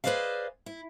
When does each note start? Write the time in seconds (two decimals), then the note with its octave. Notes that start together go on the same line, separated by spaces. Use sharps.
0.04 G#4 B4 C5 D5 D#5 F5
0.66 E4